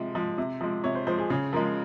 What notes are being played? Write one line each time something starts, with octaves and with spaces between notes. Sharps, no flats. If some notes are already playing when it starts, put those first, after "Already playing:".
Already playing: C3 F3 G#3
F3 G#3
C3
F3 G#3
C3 C#5
C5
F3 G#3 C5
G#4
C#3 G#4
F3 G#3 A#4